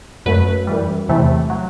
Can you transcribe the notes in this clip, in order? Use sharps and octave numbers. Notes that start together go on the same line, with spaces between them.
F#2 F#3 A3 B4
F#2 E3 G3
E2 C3 E3 A3
F#3